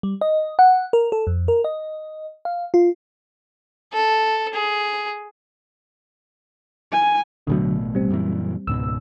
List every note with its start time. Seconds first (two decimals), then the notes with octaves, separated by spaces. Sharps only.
0.03 G3
0.21 D#5
0.59 F#5
0.93 A#4
1.12 A4
1.27 F2
1.48 A#4
1.64 D#5
2.45 F5
2.74 F4
3.93 A4
4.54 G#4
6.92 G#5
7.47 A1 B2 D3 F#3 A3
7.95 G3 C4
8.10 F#2 A#2 E3
8.67 C#2 G#2 B2 E6